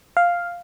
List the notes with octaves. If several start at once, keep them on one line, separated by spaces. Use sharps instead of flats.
F5